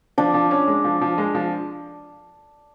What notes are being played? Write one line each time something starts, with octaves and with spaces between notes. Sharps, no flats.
F3 D4
F3
C#4
G#3
F3
F3
G#3
F3